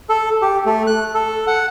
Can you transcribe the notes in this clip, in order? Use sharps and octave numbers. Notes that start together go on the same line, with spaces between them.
A4
G4
A3
F#6
A4
F#5